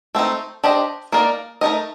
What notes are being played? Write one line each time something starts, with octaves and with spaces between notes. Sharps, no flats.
A3 C4 D#4
D4 G4 C5 D#5
A#3 D#4 A#4 D5
A3 D#4 A#4 D#5